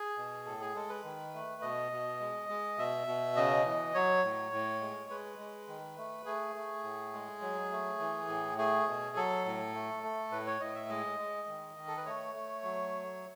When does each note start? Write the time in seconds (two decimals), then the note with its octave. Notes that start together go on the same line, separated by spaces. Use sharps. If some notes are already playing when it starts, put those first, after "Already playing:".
Already playing: G#4
0.18 B2
0.46 A2 A4
0.61 G#4
0.75 G#3 A4
0.90 B4
1.04 D#3
1.34 A3
1.62 B2 D#5
1.92 B2
2.20 G#3
2.49 G#3
2.78 B2 E5
3.07 B2
3.36 C#3 D#5
3.65 E3
3.94 F#3 C#5
4.24 A2
4.52 A2
4.81 G#3
5.10 G#3 B4
5.39 G#3
5.68 D#3
5.97 A3
6.26 A3 G#4
6.56 A3
6.84 A2
7.13 G#3
7.42 F#3
7.72 A3
8.00 E3
8.28 A2
8.58 A3 G#4
8.88 B2
9.16 F#3 A4
9.46 A2
9.74 A3
10.03 A3
10.31 A2 B4
10.47 C#5
10.60 A2 D#5
10.75 E5
10.89 G#3 D#5
11.19 G#3
11.48 D#3
11.77 D#3
11.88 A4
11.97 B4
12.05 A3 C#5
12.34 A3
12.63 F#3